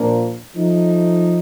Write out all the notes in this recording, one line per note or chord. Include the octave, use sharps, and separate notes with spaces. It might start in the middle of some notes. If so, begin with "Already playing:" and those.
Already playing: A#2 F3 A#3 D4
F3 A3 D#4